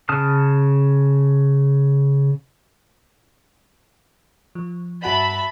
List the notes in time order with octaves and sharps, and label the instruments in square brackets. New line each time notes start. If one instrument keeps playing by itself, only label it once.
[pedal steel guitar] C#3 A5 D#6 F6
[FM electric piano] F3
[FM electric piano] G2 F#4 F#5 [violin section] E5 A5 B5